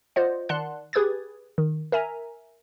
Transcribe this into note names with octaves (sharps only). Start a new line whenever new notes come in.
F4 C5 D5 D#5 F#5
D#3 D5 F#5 A5 C6 F#6
G4 G#4 B4 D#6 G#6 A6
D#3
A#4 E5 G#5 A#5